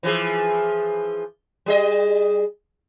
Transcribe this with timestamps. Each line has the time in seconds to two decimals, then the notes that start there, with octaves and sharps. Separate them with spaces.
0.03 E3 F3 G#4
1.66 G3 G#4 D#5